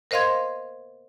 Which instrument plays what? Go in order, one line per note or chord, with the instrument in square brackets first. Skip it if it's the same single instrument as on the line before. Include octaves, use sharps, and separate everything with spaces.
[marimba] A#4 C5 D#5 F5 C6 G#6